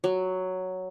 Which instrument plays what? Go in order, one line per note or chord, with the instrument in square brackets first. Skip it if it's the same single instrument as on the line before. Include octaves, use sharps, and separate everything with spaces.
[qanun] F#3